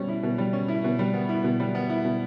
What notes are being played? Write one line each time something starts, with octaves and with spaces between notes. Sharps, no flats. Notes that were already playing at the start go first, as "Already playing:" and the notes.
Already playing: B2 G3 C#4
E4
B2
G3
C#4
E4
B2
G3
B3
E4
B2
G3
B3
E4
B2